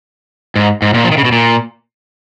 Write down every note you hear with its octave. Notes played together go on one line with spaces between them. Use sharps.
G#2
G#2
A#2
F3
D#3
C#3
B2
A#2